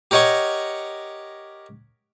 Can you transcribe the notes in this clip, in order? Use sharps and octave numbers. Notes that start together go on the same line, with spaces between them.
G4 A#4 C#5 D#5 F#5 C#6